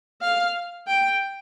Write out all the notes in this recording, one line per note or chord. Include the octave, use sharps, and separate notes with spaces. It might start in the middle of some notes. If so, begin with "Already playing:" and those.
F5
G5